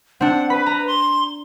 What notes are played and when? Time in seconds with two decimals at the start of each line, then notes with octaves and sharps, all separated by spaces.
0.21 C4 D4 F#5
0.50 B4 B5
0.66 A#5
0.87 C6